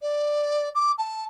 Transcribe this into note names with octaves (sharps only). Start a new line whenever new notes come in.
D5
D6
A5